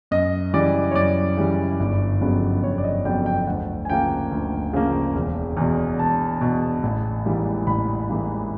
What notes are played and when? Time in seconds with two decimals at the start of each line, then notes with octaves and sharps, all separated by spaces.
0.11 F#2 D#5
0.54 C#3 E3 G3 D5
0.91 C#5
0.95 F#2 D5
1.37 C#3 E3 G3
1.80 G1
2.21 F2 C#3 F#3 B3
2.63 G1 C#5
2.78 D5
2.84 D#5
3.05 F2 C#3 F#3 B3 G5
3.26 G5
3.47 D2 F#5
3.85 G#5
3.89 C#3 F3 A#3 G5
4.31 D2
4.73 C#3 F3 A#3
5.15 E1
5.57 E2 B2
5.99 E1 A5
6.41 E2 B2
6.83 A1
7.25 G#2 E3 G3 A#3
7.67 A1 B5
8.09 G#2 E3 G3 A#3